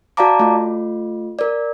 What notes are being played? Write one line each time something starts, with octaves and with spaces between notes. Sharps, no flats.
F#4 D5 F5 A5 A#5 D6
A3 F4
A#4 D5